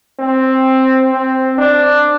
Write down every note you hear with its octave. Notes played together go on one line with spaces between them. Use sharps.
C4
C4
D4